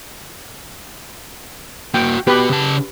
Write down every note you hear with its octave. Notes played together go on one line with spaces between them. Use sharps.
A#3 F#4 G5
B3 F#4 G4 B4
C#3 A5